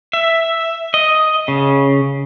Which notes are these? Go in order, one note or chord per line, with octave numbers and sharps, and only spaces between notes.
E5
D#5
C#3